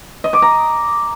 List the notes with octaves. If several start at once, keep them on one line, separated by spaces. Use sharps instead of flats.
D#5
D6
A#5